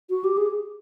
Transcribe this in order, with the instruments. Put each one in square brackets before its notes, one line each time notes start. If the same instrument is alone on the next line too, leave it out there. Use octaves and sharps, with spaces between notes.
[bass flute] F#4
G4
G#4